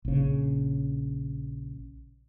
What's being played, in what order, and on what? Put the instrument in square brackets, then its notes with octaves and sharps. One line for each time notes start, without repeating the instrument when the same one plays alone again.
[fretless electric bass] A#1 C#3